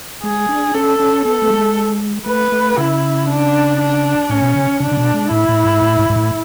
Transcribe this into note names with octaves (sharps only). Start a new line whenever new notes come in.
G#3 G#4
D4
C#4 A4
C#4
B3 A4
A3
G#3
A3 B4
A3
C#3 E4
D4
D4
A2 C#4
B2
C#3
C#3 D4
C#3
B2
G#3
A2 E4
A2
G#2
A2
G#2
G#2
A2